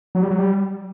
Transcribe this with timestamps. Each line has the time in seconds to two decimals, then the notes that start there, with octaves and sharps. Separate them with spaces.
0.15 F#3
0.23 G3
0.31 F#3
0.39 G3